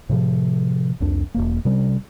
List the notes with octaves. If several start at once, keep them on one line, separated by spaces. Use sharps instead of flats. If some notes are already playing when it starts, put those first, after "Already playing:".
A2 C3 F3
C2 F2 D4
E1 F2 A#3
C3 G3 C#4